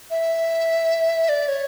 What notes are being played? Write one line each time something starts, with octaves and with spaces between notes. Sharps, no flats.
E5
D5
C#5